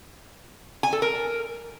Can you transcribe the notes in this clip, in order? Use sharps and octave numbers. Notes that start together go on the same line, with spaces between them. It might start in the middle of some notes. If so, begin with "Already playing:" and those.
G#5
A4
A#4